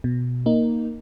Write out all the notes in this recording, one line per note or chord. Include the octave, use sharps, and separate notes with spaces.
B2
A#3 D#4